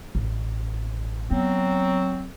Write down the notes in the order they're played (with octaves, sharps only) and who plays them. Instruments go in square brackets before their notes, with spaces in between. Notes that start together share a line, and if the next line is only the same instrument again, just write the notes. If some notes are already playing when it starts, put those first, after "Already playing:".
[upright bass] A1
[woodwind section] F#3 C4 [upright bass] B3